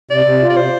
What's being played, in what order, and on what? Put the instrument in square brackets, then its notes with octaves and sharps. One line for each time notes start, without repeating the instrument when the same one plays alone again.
[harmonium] C3 [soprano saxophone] D5
[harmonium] C3
F4
[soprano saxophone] D5
[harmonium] C3 [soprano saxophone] C5